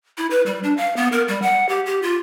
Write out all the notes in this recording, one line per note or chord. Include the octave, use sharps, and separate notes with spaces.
E4
B4
G3
D4
F5
B3
A#4
G3
F#5
G4
G4
F4